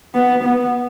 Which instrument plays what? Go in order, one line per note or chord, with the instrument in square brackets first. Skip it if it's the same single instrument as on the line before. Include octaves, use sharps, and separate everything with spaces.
[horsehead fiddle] B3
B3